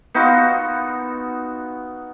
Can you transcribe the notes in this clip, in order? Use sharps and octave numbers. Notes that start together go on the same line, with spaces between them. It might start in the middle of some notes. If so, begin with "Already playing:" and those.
B3 D#4 F4 F#4